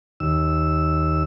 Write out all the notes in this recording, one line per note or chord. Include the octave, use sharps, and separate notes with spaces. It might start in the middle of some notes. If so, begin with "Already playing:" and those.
D#2 E6